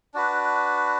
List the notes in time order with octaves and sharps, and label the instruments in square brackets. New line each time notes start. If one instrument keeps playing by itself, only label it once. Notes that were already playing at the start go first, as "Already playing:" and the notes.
[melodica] D4 F#4 B4